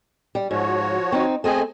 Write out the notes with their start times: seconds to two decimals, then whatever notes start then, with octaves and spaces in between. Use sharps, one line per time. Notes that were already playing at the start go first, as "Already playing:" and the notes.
0.35 G3
0.51 G#2 F3 F#4 C#5
1.12 C4 D#4
1.44 A3 C4 G#4 D#5 G#5